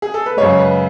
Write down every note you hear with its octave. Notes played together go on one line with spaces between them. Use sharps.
G#4
A4
B4
F#2 C#3 G#3 C#5
B4